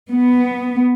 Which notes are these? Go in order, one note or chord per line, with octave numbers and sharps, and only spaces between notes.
B3